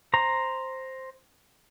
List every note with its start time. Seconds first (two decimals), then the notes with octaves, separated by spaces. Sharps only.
0.14 C5 A#5